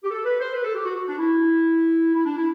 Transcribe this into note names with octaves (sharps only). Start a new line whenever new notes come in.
G4
A4
B4
C5
B4
A4
G4
F#4
F#4
D4
E4
E4
D4
E4